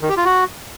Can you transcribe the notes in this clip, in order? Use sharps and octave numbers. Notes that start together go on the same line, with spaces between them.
D#3
G4
F4
F#4